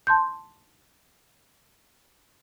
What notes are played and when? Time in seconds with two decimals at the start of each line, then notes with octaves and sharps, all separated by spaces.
0.07 A5 C6 G6